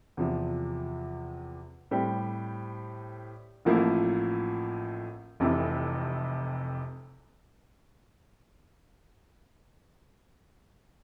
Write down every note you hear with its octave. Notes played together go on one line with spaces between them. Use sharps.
E2 C3 F3
A2 G3 C4 G4
A1 A2 F3 A#3 E4
F1 F2 C3 E3